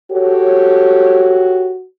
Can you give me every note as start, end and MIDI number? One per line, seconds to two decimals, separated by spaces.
0.12 1.85 66
0.12 1.73 67
0.12 1.73 69
0.12 1.73 73